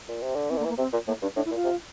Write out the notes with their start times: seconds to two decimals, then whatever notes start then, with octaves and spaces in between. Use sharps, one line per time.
0.09 A#2
0.22 C3
0.36 D3
0.50 E3 C4
0.57 D3 A#3
0.65 E3
0.69 A#3
0.78 C3 C4
0.93 A#2
1.08 A2 A#3
1.22 G2 D4
1.36 A2 D4
1.45 E4
1.51 A#2
1.55 F4
1.64 C3